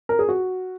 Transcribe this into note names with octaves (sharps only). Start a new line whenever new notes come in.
A#4
G#4
F#4